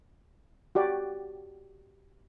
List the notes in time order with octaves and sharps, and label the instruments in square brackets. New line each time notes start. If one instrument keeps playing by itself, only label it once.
[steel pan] F#4 G4 D5